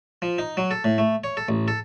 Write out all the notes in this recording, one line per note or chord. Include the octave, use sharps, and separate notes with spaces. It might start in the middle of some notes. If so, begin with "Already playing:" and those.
F3
D#4
F#3
A4
A2
A3
C#5
A4
A1
A4